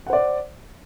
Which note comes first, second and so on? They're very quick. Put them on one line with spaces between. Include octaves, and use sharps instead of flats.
F#5 C5 D5